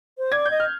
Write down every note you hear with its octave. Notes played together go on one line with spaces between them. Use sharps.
C5
D5 G#6
G6
D#5
F6